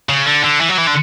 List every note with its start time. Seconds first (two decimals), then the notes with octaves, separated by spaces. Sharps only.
0.09 C#3
0.26 D3
0.44 D3
0.61 E3
0.69 F#3
0.78 E3
0.87 D3